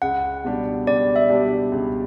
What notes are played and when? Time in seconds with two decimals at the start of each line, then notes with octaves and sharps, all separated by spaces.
0.02 C#2 F#5
0.45 B2 G3 D4 G4
0.87 C#2 D5
1.16 E5
1.29 B2 G3 D4 G4
1.72 C#2